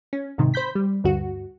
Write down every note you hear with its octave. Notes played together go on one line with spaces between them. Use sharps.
C#4
G#2 C3 D#3
C5 B5 G6 B6
G3
D2 G2 F#4